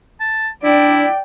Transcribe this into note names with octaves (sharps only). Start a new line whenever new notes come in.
A5
D4 E4 D5 G5